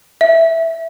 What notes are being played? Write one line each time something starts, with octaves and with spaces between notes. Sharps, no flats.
E5